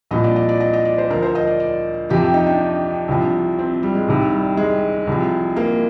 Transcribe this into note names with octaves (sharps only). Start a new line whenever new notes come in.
C2 A#2 F3 D#5
D5
D#5
D5
D#5
D#5
D5
C5
D2 D3 F3 A#4
C5
D#5
D5
D5
F2 C3 F3 G4
D#4
D4
C2 C3 F3
C4
G3
G#3
C2 C3 D#3
G3
G#3
C2 C3 F3
A#3